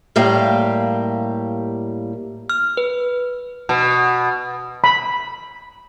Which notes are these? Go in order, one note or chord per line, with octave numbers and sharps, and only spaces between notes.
A2 G3 A#3 G4 F5
F6
B4
B2
B5